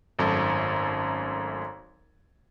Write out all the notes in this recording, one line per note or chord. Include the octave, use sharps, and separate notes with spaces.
G#1 F#2 A3 A4